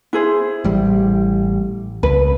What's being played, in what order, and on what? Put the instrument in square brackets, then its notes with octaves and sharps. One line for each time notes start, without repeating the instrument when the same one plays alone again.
[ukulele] E4 G#4 C5
[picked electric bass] A1 G3
[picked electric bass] C#2 [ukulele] B4